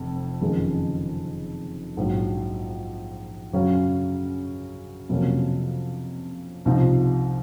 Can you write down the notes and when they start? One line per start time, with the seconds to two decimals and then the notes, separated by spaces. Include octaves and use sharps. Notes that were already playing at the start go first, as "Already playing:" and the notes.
Already playing: F1 F2
0.41 F#1 F2 D#3 G#3
1.97 A#1 G#2 F#3
3.53 F#2 C#3 F#3 C#4
5.09 F2 C3 F#3 A#3 C#4
6.65 C2 C3 F3 C4 D#4